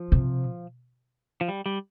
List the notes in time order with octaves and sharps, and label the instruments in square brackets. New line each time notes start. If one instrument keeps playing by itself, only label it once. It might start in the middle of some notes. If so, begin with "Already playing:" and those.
Already playing: [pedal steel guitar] F3
[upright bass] C3
[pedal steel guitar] F3
G3
G3